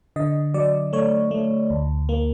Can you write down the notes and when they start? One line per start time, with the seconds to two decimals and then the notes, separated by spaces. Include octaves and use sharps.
0.16 D3 D#5
0.54 F#3 D5
0.93 A3 C#5
1.31 A3
1.70 D2
2.09 A#3